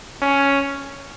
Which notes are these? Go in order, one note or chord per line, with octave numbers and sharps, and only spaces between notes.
C#4